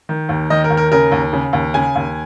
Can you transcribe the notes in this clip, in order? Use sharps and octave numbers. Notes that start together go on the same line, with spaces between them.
D#3
D#2
D#3 D#5
A#4
D#2
A#4
C#3 A#4
D#2
C#3
D#2
C#3 G#5
D#2